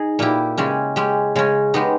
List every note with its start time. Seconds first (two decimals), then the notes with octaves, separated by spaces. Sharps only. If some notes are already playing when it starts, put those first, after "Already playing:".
Already playing: D#4 G#4
0.19 A#2 A#3 E4 G4
0.57 C#3 G#3 C#4 G4
0.96 G#3 C#4 G4
1.35 C#3 G#3 C#4
1.74 G#3 B3 D#4 G4